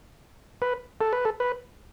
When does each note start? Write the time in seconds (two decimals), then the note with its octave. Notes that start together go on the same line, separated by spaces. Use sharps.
0.62 B4
1.01 A4
1.13 B4
1.25 A4
1.40 B4